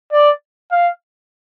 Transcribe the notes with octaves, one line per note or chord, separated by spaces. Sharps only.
D5
F5